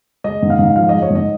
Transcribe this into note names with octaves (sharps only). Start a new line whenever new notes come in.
G#3 D#5
G#2
F5
G#2
F3 F5
G#3 D#5
C#5
G#2 D#5